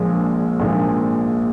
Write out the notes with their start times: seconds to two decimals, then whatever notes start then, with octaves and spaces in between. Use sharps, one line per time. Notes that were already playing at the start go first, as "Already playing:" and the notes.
Already playing: A#1 A#2 F3 G#3
0.60 A#1 A#2 F3 G#3